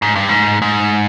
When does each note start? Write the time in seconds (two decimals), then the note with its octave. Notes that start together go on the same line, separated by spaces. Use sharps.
0.02 G#2
0.16 G2
0.29 G#2
0.62 G#2